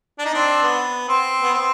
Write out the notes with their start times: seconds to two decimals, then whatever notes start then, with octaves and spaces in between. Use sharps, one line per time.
0.19 D4
0.25 D#4
0.33 C4 D4
0.63 B3
1.08 C4
1.42 B3
1.53 C4